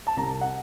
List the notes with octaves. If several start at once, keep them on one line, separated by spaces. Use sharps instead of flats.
A5
C2 A#5
F#5